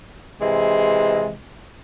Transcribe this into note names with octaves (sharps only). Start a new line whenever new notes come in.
C3 E3 G#3